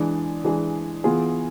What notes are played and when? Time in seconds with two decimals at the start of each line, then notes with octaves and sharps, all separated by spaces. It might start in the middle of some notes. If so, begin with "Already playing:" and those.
Already playing: E3 G#3 D4 G#4
0.44 E3 G#3 D4 G#4
1.04 E3 B3 F4 G#4